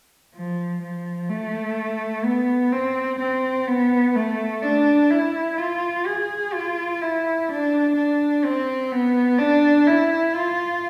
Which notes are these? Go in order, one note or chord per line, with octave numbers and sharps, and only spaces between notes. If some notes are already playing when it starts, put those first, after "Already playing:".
F3
F3
A3
B3
C4
C4
B3
A3
D4
E4
F4
G#4
F4
E4
D4
D4
C4
B3
D4
E4
F4